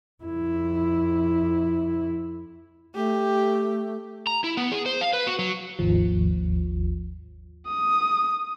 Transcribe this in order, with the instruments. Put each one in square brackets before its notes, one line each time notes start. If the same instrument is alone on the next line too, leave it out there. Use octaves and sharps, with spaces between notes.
[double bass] F2 E4
[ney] A3 [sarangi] G4
[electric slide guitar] A#5
E4
B3
G#4
C5
F5
B4
F#4
F#3
[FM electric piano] G#1 D#2 F3
[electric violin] D#6